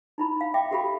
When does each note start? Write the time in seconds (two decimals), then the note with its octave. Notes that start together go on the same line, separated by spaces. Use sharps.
0.18 D#4 E4 B5
0.41 F5
0.54 E5 G5 D6
0.71 F#4 G4 A4 F5 B5